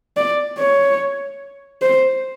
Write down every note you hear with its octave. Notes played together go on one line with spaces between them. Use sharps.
D5
C#5
C5